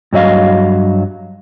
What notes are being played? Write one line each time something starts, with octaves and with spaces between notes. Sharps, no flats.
G2 F#3 D#5 F5